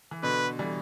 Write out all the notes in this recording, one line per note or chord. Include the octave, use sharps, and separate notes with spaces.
E3
B2 D3 B4
E3 G3